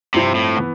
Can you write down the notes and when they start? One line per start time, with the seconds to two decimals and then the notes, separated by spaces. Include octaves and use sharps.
0.14 G2 C3 F3 C4 E4
0.35 A2
0.56 E3 B3